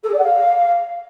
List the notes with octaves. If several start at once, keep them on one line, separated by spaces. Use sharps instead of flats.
A4
G#4
D5
F#5
F5